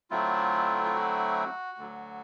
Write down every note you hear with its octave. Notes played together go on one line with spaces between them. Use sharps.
D3 F#3 A3 C4 E4 F4
F4
F#4
D2 D3 F#3